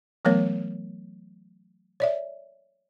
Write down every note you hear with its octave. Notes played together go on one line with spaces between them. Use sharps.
E3 F#3 A3 B3 A#4 C#5
C#5 D5 E5